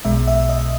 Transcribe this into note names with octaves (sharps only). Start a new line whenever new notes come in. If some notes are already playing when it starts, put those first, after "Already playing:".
B1 B2 G#3 E5
E5
D#5